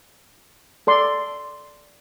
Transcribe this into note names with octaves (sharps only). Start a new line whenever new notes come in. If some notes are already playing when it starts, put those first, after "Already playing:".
A4 D5 C6